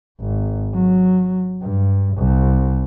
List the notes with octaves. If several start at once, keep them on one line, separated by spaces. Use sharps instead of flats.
G#1
F#3
G2
C2